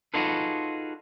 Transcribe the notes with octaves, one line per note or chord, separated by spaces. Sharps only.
D#4 F4 F#4 G#4 A4 B4